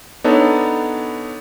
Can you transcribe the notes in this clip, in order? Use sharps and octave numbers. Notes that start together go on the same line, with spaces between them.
B3 D4 D#4 A4 C#5